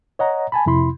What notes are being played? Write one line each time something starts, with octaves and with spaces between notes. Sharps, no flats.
C#5 D#5 F#5 A#5
G#5 A5 B5
F2 C3 E4 B5 C6